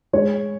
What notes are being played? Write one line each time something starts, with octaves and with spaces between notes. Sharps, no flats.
G#3 C#5